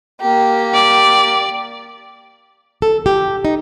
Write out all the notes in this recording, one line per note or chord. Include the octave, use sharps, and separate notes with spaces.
A#3 G4
D5
A4
G4
D#4